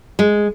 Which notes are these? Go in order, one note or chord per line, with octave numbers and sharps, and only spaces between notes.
G#3